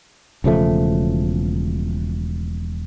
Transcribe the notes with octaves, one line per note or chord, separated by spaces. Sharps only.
E1 C#3 F3 A3